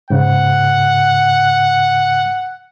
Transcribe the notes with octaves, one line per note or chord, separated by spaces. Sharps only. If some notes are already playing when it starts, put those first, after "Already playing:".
G#2 C#3 F#5